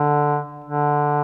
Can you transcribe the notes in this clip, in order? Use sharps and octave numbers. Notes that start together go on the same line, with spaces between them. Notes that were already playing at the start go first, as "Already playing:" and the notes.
Already playing: D3
D3